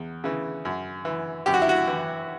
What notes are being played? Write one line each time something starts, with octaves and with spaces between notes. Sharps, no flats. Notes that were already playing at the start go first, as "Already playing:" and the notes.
Already playing: E2
C#3 E3
F#2
E3
F#2 G4
F#4
E4
F#4
E3